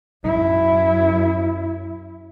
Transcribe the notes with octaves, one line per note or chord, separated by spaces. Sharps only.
F#2 E4